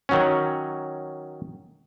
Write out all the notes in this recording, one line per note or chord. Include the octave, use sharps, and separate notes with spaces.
D#3 F#3 C#4